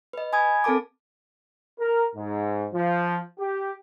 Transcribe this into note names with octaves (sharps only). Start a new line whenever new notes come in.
B4 D#5
G#5 B5 D#6 G#6
C4 A4 A#4 A5 D6
A#4
G#2
F3
G4